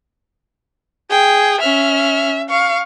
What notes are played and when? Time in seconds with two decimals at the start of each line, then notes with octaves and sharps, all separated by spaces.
1.10 G#4 G5
1.61 C#4 E5 F6
2.49 F5 C#6